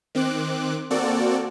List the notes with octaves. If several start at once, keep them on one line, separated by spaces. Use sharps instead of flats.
D#3 C4 D6 F#6
A#3 C4 F#4 A4 D5